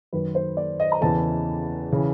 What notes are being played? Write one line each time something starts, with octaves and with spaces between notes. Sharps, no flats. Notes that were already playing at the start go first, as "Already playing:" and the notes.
F#2 D#3 B4
C5
D5
D#5
A#5
E2 C#3 E3 A5
C#3 E3